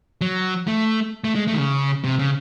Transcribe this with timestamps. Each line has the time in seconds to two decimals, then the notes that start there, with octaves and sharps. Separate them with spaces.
0.21 F#3
0.67 A3
1.24 A3
1.35 G#3
1.47 A3
1.54 D#3
1.59 C#3
2.04 C3
2.19 C#3